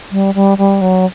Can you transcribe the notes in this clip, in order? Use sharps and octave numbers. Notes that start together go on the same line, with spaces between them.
G3
G3
G3
F#3